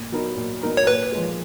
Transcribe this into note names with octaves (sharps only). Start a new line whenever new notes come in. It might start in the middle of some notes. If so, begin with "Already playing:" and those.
Already playing: A#2
F#3 B3 D#4 A#4
A#2
F#3 B3 D#4 A#4
C#5
A#2 B4
G#3
F3